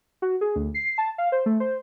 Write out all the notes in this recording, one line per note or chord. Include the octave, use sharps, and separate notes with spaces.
F#4
G#4
D2
C7
A5
F5
C5
A3
C5